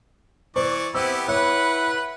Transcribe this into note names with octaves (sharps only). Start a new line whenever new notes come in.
E3 C5 D5 C#6
B3 C4 E4 G4 E6
E4 B4 C#5 F#5